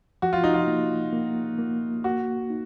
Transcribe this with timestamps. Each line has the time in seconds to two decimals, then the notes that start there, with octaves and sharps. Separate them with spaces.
0.22 F3 F#4
0.33 F4
0.44 D#4
0.54 F4
0.67 A#3
1.13 A#3
1.59 A#3
2.04 A#3 F#4
2.50 D#4